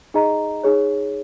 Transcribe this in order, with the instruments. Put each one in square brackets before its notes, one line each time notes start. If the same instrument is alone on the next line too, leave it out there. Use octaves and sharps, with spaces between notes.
[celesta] D#4 G#4 D#5 A#5
D#4 G#4 C#5